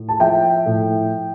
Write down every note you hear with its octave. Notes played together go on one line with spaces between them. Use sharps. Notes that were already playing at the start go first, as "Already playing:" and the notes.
Already playing: A2
A5
F3 E5 G5
A2